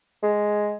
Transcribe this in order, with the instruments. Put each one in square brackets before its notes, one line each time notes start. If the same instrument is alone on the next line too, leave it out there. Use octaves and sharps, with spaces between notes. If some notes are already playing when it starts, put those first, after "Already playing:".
[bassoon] G#3